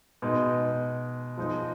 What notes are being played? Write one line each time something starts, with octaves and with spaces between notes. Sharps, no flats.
B2 G#3 D#4
F3 G#3 D#4